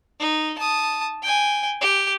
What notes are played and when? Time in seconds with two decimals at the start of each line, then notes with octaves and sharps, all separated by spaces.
0.20 D#4
0.58 A5 D#6
1.22 G5 G#5
1.81 G4